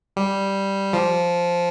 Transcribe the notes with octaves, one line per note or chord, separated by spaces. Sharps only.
G3
F3